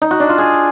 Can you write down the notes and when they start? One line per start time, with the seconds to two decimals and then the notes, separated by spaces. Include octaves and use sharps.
0.02 D#4
0.11 F#4
0.20 D4
0.29 F4
0.38 G#4